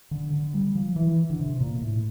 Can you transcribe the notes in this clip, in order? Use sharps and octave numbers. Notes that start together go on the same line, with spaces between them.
D3
D3
G3
F3
E3
D3
C3
A#2
A2